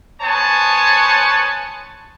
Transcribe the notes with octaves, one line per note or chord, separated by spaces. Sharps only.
B3 C5 C#5 G#5 A5